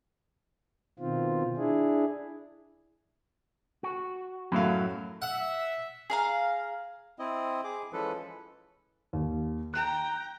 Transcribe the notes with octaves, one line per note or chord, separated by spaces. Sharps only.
B2 D#3 C4 F4
D4 E4 G#4
F#4
F#2 A2 F#3 E4 F5
E5 F#5
G#4 F5 A#5
C4 E4 D#5
G#4 D6
E3 F3 G#3 C#4 A4 B4
D#2
G5 A#5 F#6